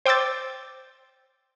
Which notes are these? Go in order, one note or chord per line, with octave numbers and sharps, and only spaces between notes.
C5 G5 D6 E6 G6 A6